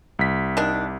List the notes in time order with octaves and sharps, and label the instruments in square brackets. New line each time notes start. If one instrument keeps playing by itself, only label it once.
[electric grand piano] C2 B6
[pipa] D#3 D4